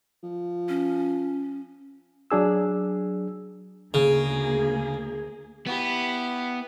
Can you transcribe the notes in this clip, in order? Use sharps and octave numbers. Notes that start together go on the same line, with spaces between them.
F3
C#4
F#3 D4 G#4 E6
D2 C#3 A#3 G#4
B3 E4 G4